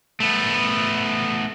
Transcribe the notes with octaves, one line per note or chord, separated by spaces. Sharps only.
A3 B3